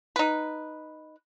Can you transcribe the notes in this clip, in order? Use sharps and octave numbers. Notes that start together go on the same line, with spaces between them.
D#4 B4